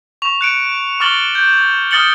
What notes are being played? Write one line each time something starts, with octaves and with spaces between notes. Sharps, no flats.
C#6 F7
F#6 C#7 D7
C#6 D6 F6 A6 F#7 G7
G6
D#6 F6 A6 C#7 F#7 G7